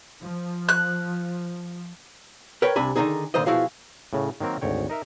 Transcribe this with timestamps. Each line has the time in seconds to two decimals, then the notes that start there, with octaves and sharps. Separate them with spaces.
0.21 F3
0.69 F#6
2.62 A#4 B4 C#5 G5
2.76 C2 C3 D4 G#5 B5
2.96 D3 D#3 F#3 G#3 D#4 G#4
3.34 A#2 D3 D#3 C5 D#5
3.46 B2 F3 E4 F#4 G#4 F5
4.13 A2 C#3
4.40 D#3 F#3 A#3 C4 A#4
4.61 G#1 D2 C#5 G5
4.90 D#4 A#4 E5